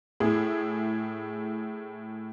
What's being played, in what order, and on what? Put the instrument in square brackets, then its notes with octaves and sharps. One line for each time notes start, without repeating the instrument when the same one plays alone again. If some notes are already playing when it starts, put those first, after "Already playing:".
[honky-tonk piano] A2 E4 G#4